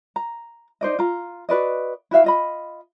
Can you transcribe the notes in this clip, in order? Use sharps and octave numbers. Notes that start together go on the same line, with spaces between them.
A#5
D#4 C5 D5 D#5
F4 A#5
F#4 B4 D5 D#5
E4 F#4 E5 F5
F4 D#5 B5